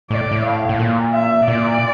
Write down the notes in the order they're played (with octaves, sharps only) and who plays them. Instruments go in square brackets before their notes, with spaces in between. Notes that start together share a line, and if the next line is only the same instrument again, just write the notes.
[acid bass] A2 [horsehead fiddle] D5
[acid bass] A2
[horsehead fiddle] F5
[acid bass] A2
A#2
[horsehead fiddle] E5
[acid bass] A#2 [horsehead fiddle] D5